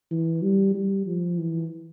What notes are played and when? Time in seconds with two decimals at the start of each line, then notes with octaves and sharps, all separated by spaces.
0.11 E3
0.42 G3
0.74 G3
1.06 F3
1.38 E3